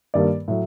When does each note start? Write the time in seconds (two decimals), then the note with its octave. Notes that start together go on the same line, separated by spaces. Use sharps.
0.14 G2 D#3 G3 A#3 D5
0.48 A2 F#3